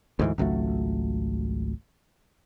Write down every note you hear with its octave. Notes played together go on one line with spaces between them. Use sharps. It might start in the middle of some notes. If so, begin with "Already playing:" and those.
D2 G#2 E3
G#1 C#2 F#3 A3